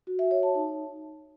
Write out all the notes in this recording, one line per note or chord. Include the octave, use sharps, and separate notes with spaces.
F#4
E5
C#5
A5
D#4